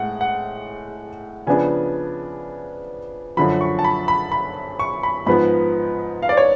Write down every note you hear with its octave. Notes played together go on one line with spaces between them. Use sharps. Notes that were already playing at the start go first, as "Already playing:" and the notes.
Already playing: A2 G#3 F#5
F#5
C#3 F3 B3 D4 G#5
F#2 D3 F3 B5
C#6
A5
B5
B5
B5
C#6
B5
G#2 F3 B3 B5
F5
D5
C#5